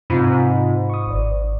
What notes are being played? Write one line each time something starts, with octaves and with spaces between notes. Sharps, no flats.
G#2 C3 F4 B5
C#6 D#6
G#1 D5